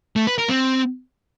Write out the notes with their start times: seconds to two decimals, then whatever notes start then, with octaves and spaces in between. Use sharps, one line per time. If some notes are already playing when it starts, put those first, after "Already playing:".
0.16 A3
0.27 B4
0.38 A#4
0.49 C4